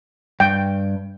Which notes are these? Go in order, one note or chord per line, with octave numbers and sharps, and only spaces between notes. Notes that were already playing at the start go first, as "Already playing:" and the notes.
G2 G5